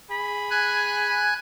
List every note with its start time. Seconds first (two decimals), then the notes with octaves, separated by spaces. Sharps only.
0.10 G#4 B5
0.50 G#5 F#6 G#6